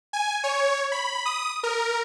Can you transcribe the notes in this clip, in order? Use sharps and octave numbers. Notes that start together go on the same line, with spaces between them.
G#5
C#5
B5
D#6
A#4